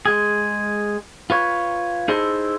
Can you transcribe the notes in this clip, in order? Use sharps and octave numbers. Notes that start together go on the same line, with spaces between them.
G#3 G#4
F4 B4 C#5
D#4 E4 G#4 A4 C5 D#5